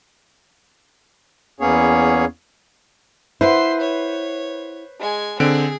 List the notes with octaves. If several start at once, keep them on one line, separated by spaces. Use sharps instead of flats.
E2 A#3 B3 C#4 G#4 C#5
E4 B4 C5 F#5 C6
C#5
G#3 G#5
D3 C4 G#4 D7